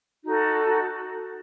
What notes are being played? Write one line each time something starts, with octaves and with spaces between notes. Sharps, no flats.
D#4 F#4 A4